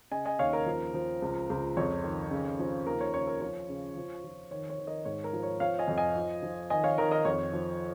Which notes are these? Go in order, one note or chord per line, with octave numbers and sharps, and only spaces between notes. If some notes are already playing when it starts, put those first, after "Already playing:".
C#3 D#5 G#5
D#5 G#5
D#2 C#5 F5
A#4
F3
F3
C#2
C#2
F2 C#5
D#3
C#3
F3
D#2 A#4
C#5
C#3 C#5
A#4
F3 C#5
C#3
F3
F3
D#3 C#5
C#5
D#3
A#4 D#5
G#2 C#5
A#4
F3
C#5
F3 C#5 F5
D#5 G#5
F2
D#5 G#5
F3
F3
D#3 D#5 G#5
C#5 F5
D#3 A#4 D#5
A#4 D#5
F2 C#5
F3